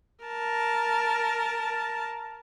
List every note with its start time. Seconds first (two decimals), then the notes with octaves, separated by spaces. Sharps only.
0.24 A#4 A5